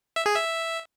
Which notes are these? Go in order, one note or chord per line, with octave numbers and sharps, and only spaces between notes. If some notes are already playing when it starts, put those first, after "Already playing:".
E5
G#4
E5